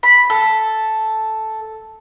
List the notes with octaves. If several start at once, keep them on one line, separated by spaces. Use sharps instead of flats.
B5
A4